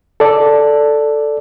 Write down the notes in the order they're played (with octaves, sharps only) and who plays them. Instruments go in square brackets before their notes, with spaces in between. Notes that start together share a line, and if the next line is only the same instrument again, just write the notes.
[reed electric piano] A4 D5